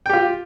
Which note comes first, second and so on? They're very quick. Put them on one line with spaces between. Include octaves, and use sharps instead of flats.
G5 G4 F4